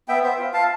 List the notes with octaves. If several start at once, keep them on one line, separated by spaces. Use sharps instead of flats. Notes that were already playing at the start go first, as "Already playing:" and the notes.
B3 E5 G5
C5 E5
F4
F5 A5